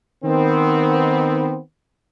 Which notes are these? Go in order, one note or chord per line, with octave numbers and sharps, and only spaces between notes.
D#3 B3 C4